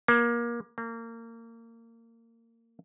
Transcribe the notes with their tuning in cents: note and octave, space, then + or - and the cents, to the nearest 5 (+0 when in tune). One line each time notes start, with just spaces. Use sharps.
A#3 +25
A#3 -25